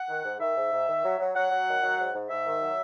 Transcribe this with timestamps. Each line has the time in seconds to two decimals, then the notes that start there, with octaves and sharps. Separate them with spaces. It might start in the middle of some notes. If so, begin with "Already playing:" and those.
Already playing: F#5
0.09 D#3
0.24 G#2
0.40 D#3 E5
0.56 G#2
0.72 G#2
0.88 D#3
1.03 F#3
1.19 F#3
1.35 F#3 F#5
1.51 F#3
1.67 D#3
1.83 F#3
1.98 G#2
2.14 G#2
2.30 G#2 E5
2.46 D#3
2.61 F#3